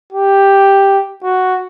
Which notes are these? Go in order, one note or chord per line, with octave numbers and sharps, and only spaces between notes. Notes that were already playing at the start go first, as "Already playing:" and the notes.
G4
F#4